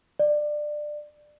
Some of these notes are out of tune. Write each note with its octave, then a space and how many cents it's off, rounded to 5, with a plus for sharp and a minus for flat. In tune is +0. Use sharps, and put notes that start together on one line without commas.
D5 +20